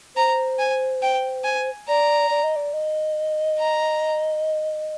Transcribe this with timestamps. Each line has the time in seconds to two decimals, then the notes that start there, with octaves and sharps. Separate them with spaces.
0.16 C5 A#5
0.59 G#5
1.02 G5
1.44 G#5
1.88 D5 A#5
2.31 D5
2.43 D#5
2.56 D5
2.73 D#5
3.59 A#5